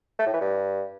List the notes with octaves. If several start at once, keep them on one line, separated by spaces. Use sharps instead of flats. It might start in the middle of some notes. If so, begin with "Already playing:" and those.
A3
A2
E3
G2